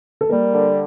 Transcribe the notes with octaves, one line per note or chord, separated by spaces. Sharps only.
A4
G3 A#3 A#4
D3